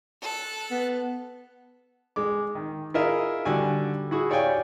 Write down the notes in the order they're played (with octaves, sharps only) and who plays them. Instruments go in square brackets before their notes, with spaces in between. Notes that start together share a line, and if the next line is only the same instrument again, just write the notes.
[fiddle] A4 F#6
[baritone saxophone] B3
[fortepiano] G#3 D6
D#3
E4 F4 G#4 A#4 D#5 E5
D3 G3 F#4 G#5
E4 F#4 G#4
G4 C#5 D5 F5 G5 G#5